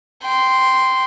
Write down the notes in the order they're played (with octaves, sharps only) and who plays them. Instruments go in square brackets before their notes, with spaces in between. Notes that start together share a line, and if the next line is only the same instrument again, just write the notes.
[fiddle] G5 C6